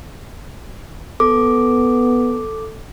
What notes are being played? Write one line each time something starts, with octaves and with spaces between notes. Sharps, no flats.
B3 A4 D6